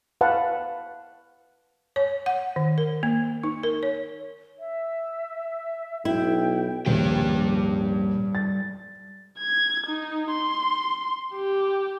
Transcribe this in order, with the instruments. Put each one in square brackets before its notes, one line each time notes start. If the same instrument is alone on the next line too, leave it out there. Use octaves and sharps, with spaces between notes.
[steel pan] B4 F5 F#5 A5
[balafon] C#5
F#5
D#3
A#4
A#3
D#4
A#4
C#5
[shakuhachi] E5
[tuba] B1 [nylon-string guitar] E4 [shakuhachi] G5
[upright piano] D#1 A#1 [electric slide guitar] G3 B4 G5
[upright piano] A6
[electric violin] G#6
D#4
C6
G4